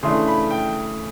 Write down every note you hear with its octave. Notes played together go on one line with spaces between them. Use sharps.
C#3 E3 A3 D4 C6
B5
G5